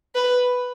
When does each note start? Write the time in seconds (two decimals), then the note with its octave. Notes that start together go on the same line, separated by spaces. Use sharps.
0.15 B4